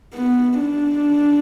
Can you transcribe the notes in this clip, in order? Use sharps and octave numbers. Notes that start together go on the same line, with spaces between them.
B3
D4